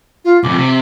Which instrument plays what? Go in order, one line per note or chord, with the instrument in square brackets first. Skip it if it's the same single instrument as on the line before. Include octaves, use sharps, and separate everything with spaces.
[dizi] F4
[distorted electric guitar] C2 F2 [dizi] D6
[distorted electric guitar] C3